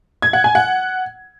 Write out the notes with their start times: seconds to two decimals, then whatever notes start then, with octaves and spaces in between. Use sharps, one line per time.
0.22 G#6
0.33 F#5
0.44 G#5
0.55 F#5